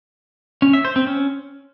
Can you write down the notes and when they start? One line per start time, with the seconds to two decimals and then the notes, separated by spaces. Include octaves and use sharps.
0.62 C#4
0.73 E5
0.85 C5
0.96 C4
1.07 C#4